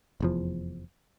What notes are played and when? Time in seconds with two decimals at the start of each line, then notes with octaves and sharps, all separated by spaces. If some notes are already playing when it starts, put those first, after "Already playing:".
0.20 F1 E2 F3